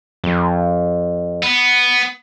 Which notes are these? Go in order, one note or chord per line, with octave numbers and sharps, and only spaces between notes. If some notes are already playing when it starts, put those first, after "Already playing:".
F2
B3